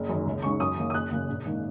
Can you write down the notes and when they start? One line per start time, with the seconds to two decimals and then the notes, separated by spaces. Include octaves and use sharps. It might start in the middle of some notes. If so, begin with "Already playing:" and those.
Already playing: F#1
0.09 F#2 D#3
0.26 C#2
0.42 C#3 G#3 D#4 C#6
0.60 F#2 D#6
0.77 D#3 A#3
0.90 D#6
0.94 F#1 F#6
1.11 F#2 C#3 A#3
1.28 A#1
1.45 G#2 D#3 A#3